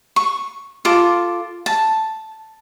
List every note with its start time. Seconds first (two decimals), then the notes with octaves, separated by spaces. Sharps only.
0.16 C#6
0.85 F4 A4 D6
1.66 A5